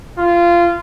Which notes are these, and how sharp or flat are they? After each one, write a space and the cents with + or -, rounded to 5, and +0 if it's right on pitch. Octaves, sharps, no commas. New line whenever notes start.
F4 -20